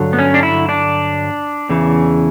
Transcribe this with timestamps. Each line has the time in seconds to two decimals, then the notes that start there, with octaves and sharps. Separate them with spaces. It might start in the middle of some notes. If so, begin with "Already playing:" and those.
Already playing: G2 D3 F#3
0.13 B3
0.19 C#4
0.34 D4
0.43 E4
0.69 D4
1.69 E2 C#3 E3